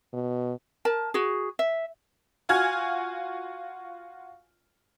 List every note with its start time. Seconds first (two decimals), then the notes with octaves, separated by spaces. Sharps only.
0.13 B2
0.85 A#4 A5
1.14 F#4 G#4
1.59 E5
2.49 F4 F#4 G#5 F6 G#6